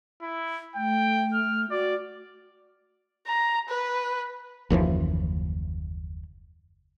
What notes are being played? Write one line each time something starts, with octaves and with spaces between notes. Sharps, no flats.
E4
A3 G5
F6
F#4 D5
A#5
B4
F#1 D#2 E3 F3